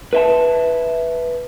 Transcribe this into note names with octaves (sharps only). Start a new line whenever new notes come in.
B4 E5 A5